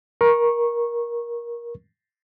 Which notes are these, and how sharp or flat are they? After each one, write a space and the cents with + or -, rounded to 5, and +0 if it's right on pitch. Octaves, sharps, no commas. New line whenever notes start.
A#4 +20 C#6 -15